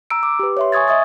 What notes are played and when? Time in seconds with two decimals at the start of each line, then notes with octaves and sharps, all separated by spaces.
0.10 A#5 E6 D7
0.23 D6
0.39 G4 B4
0.57 C#5 E5 C6
0.72 G#5 C#6 D#6 G#6 A6
0.88 D#5 E5 D#6 A6